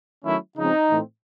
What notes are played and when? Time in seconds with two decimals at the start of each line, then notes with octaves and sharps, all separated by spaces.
0.25 D#3 F#3 A3 C#4 E4
0.57 C#3 F3 G#3 C4 D#4
0.90 A2 E3 A3 C4